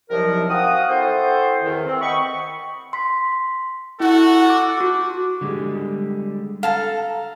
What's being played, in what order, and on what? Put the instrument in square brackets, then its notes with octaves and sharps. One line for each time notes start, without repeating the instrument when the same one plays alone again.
[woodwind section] C2 C3 D#3 F3 F#3 A#4
C4 F#4 F5 F#5 D#6
C4 E4 F#4 A4 C5
E2 D#3
C4
D#5 F#5 G5 B5 C#6
[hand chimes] C6 B6
[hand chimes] E4 [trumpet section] F#4 A4 F#5
[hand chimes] D6 F#6
F#4 D6
[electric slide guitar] D3 G3 G#3
[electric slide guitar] A4 [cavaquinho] F5 A5 A#5